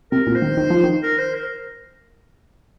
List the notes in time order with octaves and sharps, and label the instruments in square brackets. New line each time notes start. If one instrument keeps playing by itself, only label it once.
[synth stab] C3 [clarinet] A#4
[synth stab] A#2
[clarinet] C5
[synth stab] D#3
D#3
F3
D#3
[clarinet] A#4
C5
A#4